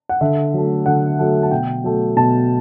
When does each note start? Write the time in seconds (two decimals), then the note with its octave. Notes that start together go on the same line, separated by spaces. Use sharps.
0.09 F#5
0.21 D3 E5
0.54 F#3 A3
0.86 D3 F#5
1.19 F#3 A3
1.43 A5
1.51 B2 G5
1.84 F#3 A3
2.16 B2 A5